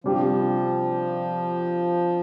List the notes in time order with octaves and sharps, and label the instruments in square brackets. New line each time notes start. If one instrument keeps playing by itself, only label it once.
[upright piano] C3 G3 D4 G4 [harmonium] F3